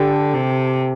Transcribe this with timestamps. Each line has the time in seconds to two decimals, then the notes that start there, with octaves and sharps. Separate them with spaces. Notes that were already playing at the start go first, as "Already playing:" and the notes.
Already playing: D3 G4 A4
0.33 C3